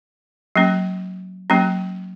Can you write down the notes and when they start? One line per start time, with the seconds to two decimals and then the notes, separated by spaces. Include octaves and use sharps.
0.56 F#3 A#3 C#4
1.50 F#3 A#3 C#4